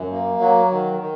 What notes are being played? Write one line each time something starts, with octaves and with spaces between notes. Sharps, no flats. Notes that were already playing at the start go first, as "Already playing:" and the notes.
Already playing: F#2
A#3
F#3
D#3
D#3